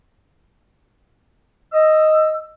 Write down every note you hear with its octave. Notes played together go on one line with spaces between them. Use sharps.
D#5 E6